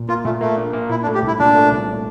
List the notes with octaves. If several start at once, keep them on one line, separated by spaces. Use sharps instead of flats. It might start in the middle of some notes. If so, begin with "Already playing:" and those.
Already playing: A#2
A#3 F4
A#2 A3
A3 A#3
D4
A#3
A#2 E4
D4
A3
G4
C2 E4
A#2 D4
A3
C2